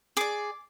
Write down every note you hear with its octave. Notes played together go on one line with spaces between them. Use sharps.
G#4 D5 D6